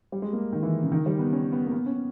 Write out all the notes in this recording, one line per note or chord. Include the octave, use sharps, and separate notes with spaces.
G3
G#3
A#3
D#3
E3
C#3
D#3
G3
B3
C#4
B3
A#3
B3
C#4